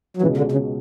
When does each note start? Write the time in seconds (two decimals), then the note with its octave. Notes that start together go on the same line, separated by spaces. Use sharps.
0.17 F#3
0.22 C#2 B2 E3 G#3 C#4 F#4
0.37 D3
0.52 C#3